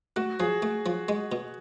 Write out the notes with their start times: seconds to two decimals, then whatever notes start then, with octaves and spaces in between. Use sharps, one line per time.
0.16 A3 F#4
0.40 F3 G#4
0.62 A3
0.86 F3
1.08 G#3
1.32 B2